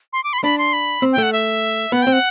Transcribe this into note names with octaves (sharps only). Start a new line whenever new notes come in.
C6
D6
B5
C6
D4 B5
C6
B5
C4
G5
A3 F#5
E5
B3 F#5
C4 G5
F#5